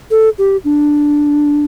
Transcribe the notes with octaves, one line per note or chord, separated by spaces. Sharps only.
A4
G4
D4